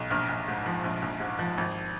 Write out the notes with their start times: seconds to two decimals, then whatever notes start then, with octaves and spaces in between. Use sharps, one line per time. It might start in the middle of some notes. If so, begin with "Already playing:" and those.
Already playing: B1
0.10 A#1 F6
0.29 A#1
0.48 G#2
0.66 F3
0.84 A#1
1.02 A#1
1.20 G#2
1.39 F3
1.58 G#1